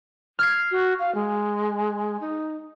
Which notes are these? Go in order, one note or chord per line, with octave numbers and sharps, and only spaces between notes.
F6 G#6 C7
F#4
F5
G#3
D#4